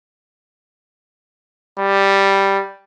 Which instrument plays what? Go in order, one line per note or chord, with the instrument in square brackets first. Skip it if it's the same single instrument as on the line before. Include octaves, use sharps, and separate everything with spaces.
[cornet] G3